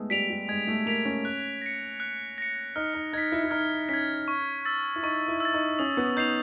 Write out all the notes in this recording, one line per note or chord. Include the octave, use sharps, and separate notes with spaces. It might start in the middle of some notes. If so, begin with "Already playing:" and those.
Already playing: G#3 A3 B3
G3 B6 D7 F7
G3
G#3 G#6
A3
A#3 B6 D7 F7
C#4
F#6
A#6 C#7
F#6
A#6 C#7
D#4 F6
D#4
D#4 G#6 B6
E4
E4
D#4 F6
C#4 G#6 B6
C#6
E6 A6
E4
D#4 C#6
E4
E6 A6
D#4
C#4 D#6
B3
D#4 G6 C7 F7